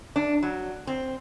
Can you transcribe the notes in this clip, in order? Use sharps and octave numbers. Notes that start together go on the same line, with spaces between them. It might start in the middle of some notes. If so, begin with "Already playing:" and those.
D4
F#3
C4